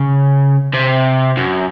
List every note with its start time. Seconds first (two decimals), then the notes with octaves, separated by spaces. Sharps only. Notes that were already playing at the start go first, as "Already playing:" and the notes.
Already playing: C#3
0.74 C3
1.37 F#2